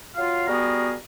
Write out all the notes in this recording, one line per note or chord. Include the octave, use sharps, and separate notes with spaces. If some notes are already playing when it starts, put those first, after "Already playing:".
F#3 F4 F5
G3 B3 F#4 G#4 A#4